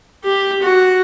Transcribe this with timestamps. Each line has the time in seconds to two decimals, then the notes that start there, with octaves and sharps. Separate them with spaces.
0.25 G4
0.62 F#4